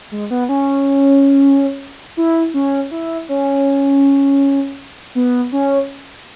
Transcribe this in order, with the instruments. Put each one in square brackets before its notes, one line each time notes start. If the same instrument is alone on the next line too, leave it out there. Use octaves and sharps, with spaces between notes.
[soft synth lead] G#3
B3
C#4
E4
C#4
E4
C#4
B3
C#4